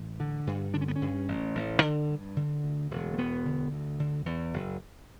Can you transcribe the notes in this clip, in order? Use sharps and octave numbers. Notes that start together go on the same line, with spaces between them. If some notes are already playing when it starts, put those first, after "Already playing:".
Already playing: A1
D3
G2
D3 D4
C#4
B3
C#4
G2
A1
A1
D3
G2
D3
D2
E1
A3
E1 B3
D3
D2
D3
E2
F#1